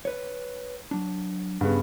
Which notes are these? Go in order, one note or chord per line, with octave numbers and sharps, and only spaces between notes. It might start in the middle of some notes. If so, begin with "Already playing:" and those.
B4 C#5
F#3 D4
G2 C#3 B3